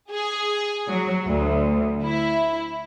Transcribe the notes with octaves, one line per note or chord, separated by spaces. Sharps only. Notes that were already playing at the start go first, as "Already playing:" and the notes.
G#4
F#3
D2
E4